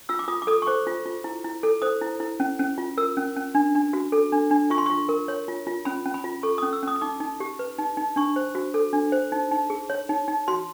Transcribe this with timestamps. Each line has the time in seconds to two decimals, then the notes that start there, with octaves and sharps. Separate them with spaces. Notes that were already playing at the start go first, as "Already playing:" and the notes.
0.09 F4 E6
0.19 D6
0.28 F4 D#6
0.42 D6
0.47 A4 D#6
0.62 C#6
0.67 C5 D6
0.87 F4
1.06 F4
1.24 E4
1.44 E4
1.63 A4
1.82 C5 D#6
2.01 E4
2.20 E4
2.40 C#4
2.59 C#4
2.78 F4
2.97 A#4 E6
3.17 C#4
3.37 C#4
3.55 D4
3.75 D4
3.93 F#4
4.12 A4
4.32 D4
4.51 D4
4.70 F4 C#6
4.78 C6
4.86 F4 C#6
5.09 A#4
5.28 C#5
5.48 F4
5.67 F4
5.85 C#4 B5
6.06 C#4
6.14 B5
6.24 F4
6.43 A4 C#6
6.58 C#4 D#6
6.73 E6
6.83 C#4 D#6
6.96 D#6
7.02 D#4 D6
7.20 D#4
7.40 G4
7.59 B4
7.79 D#4
7.97 D#4
8.16 D4 C#6
8.36 C5
8.55 F#4
8.74 A4
8.93 D4
9.12 C5
9.32 D#4
9.51 D#4
9.70 G#4
9.90 C#5
10.09 D#4
10.28 D#4
10.48 F#4 C6